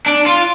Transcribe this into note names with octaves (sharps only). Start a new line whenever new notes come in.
D4
F4